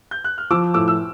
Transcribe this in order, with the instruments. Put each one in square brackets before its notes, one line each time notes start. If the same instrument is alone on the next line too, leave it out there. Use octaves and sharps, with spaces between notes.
[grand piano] G6
F#6
F6
[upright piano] F3 [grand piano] D6 E6
[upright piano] A2 [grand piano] D6 E6
[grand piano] E6